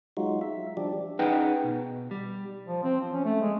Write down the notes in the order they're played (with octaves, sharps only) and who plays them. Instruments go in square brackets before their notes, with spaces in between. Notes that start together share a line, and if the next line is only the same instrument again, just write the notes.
[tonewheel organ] F#3 G#3 D#4 F4 F#4
E5
F3 G3 D4 G4 D5
[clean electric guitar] C#4 D#4 G#4 B4 F#5 G5
B2
G3
[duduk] F3
C4
F3
C#4
A3
G#3